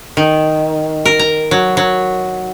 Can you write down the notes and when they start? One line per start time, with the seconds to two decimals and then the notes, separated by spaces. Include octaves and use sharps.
0.17 D#3
1.05 A#4
1.19 A#5
1.51 F#3
1.77 F#3